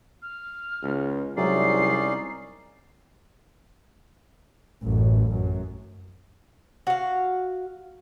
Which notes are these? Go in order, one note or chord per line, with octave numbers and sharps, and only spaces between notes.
F6
C#2
C2 F#3 G#3 C#4 D#4 D5 E5 C7
A1 F#2
F#2
F#4 F5